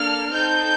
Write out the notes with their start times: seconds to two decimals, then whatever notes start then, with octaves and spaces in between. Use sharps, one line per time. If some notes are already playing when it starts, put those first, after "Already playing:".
Already playing: A#3 D4 A4 F6
0.34 C4 D#4 A4 G6